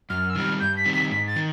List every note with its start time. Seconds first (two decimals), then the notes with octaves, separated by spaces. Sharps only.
0.09 F#2 F6
0.30 E6
0.35 D#3 G3 C4 F6
0.60 G2 G6
0.77 B6
0.85 D#3 G3 C4
0.93 B6
1.11 G#2 B6
1.27 A6
1.36 D#3